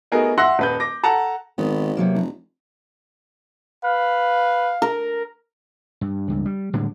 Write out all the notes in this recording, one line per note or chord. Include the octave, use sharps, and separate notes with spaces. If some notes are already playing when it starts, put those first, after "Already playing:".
A3 B3 D#4 F#4 G#4 A#4
E5 F#5 C6 E6 F#6 A#6
D#1 B4 G6
D6 A#6
A4 F#5 A5 A#5
G#1 D#3 B3
C3 F#3 A#3
F1
B4 F5
A#4
G2
C#2 G2
G3
A2 D3 G3 G#3